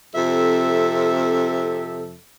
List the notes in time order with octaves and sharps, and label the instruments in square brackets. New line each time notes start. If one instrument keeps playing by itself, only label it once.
[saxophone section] F2 C3 A4 E5